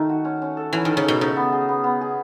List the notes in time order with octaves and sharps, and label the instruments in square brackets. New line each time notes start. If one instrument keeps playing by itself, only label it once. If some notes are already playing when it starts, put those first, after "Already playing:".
Already playing: [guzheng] D#3 [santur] A3
[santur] F#4
C#4
C#4
A4
[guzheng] E3 [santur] C#4
[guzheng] D#3 [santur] A4
[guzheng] C#3
[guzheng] B2 [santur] A4
[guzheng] C#3 [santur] D#4
[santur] B3
G#4
B3
B3
G#4